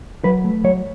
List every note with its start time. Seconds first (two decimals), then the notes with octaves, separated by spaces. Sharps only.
0.24 F#3 B4
0.44 A3
0.64 F#3 C#5